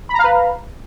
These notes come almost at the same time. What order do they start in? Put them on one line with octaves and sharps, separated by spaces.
B5 A#5 F5 B4